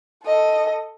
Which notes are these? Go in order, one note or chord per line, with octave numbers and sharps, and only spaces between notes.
A4 D#5